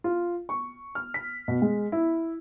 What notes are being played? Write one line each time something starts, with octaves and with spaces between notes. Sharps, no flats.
F4
C#6
F6
B6
B2
G#3
E4